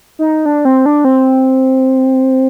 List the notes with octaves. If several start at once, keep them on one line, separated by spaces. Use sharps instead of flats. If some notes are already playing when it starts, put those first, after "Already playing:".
D#4
D4
C4
D4
C4